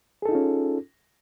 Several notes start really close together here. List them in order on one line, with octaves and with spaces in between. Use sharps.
G#4 A4 D#4 F4 C#4